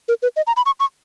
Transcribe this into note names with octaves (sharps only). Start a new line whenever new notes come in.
A#4
B4
D#5
A#5
B5
C#6
C#6